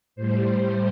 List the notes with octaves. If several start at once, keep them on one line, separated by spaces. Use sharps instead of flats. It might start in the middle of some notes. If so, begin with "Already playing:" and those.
A2 G3 C5